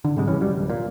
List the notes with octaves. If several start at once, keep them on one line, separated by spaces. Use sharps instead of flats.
D3
G#2 C3 G3 G#3
E1 C2 E3 C#4
F1 F#3 G3
D1
A#2